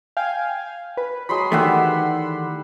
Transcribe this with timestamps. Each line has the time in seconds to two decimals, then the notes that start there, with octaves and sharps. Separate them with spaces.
0.17 F5 G5 G#5
0.97 B4
1.29 F#3 G#3 B5 C6
1.52 D#3 E3 G3 A3 E5 F#5